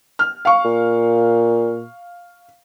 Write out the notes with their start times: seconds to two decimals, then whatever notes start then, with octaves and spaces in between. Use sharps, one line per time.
0.19 F6
0.45 F5 C#6
0.65 A#2